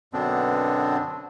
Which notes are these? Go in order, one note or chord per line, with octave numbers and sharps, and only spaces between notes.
F#2 B2 D3 B3 C4 D4